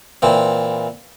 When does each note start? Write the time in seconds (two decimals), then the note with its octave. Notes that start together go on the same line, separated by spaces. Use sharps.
0.22 A#2 E3 C4